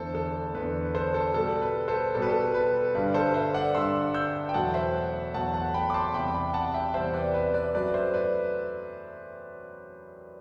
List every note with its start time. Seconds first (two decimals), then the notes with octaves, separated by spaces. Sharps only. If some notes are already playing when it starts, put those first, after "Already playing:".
Already playing: E2 D3 A3 A4 C5
0.15 A4
0.54 E2 D3 A3 B4
0.95 A4 C5
1.14 A4
1.34 B2 G3 A4
1.62 B4
1.88 A4 C5
2.14 B2 G3 A4
2.22 B4
2.29 A4
2.54 B4
2.95 G2 D3 G3 B4
3.14 A4 C5
3.34 C5 E5
3.54 D5 F#5
3.75 G2 D3 G3 C6 E6
4.14 E6 G6
4.49 G5
4.54 E2 B2 F#3 A3 F#5 A5
4.74 C5 E5
5.34 E2 B2 F#3 A3 F#5 A5
5.54 F#5 A5
5.74 G5 B5
5.90 D6
5.94 A5 C6
6.14 E2 C3 G3 G5 B5
6.34 G5 B5
6.54 F#5 A5
6.74 E5 G5
6.94 E2 C3 G3 C5 E5
7.14 B4 D5
7.34 B4 D5
7.54 B4 D5
7.75 F#2 F#3 A3 B4 D5
7.94 C5 E5
8.14 B4 D5